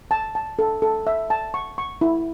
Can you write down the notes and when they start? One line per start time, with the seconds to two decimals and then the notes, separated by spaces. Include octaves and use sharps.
0.11 A5
0.35 A5
0.59 A4
0.82 A4
1.07 E5
1.30 A5
1.54 C#6
1.78 C#6
2.01 E4